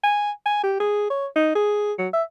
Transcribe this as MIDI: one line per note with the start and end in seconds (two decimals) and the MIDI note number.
0.04 0.31 80
0.46 0.63 80
0.63 0.77 67
0.80 1.09 68
1.10 1.26 73
1.36 1.54 63
1.55 1.93 68
1.99 2.08 54
2.13 2.23 76